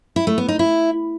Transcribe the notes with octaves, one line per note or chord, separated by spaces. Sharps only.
E4
A3
B3
D#4
E4